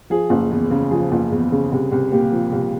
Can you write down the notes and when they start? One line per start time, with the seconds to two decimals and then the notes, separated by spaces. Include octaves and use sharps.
0.10 F3 G#4
0.30 F#1
0.51 E2
0.71 C#3
0.90 F3 G#4
1.12 F#1
1.32 E2
1.52 C#3
1.72 C2
1.92 C2
2.12 A#2 G4
2.32 F3
2.52 C2